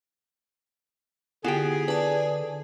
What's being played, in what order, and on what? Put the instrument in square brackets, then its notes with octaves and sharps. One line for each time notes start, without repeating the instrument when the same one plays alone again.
[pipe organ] D3 [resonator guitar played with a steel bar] B3 G5 [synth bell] E4 F4 G4 [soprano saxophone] G#4
[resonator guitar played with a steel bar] D4 [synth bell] B4 A5